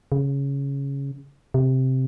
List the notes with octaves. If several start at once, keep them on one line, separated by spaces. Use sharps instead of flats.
C#3
C3